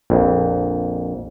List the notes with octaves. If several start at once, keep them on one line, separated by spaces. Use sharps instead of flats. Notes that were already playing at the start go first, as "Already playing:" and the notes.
A#1 F2